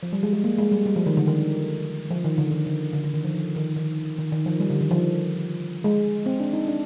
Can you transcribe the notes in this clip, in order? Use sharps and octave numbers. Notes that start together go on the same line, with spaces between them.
F3
G3
G#3
G#3
A#3
G#3
G3
G3
F3
D#3
D3
D#3
F3
D#3
D3
D#3
D3
D3
D3
D#3
F3
F3
D#3
D#3
D#3
D#3
F3
G3
D3
D#3
F3
G#3
C4
D4
D#4
D4